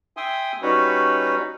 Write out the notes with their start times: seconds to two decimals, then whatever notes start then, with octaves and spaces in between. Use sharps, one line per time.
0.17 E5 G5 G#5 C6 D#6
0.62 G3 C#4 D#4 F#4 B4 C#5